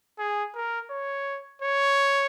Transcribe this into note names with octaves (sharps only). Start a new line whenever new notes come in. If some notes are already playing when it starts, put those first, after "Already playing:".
G#4
A#4
C#5
C#5